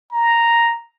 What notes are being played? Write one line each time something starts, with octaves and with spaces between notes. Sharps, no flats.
A#5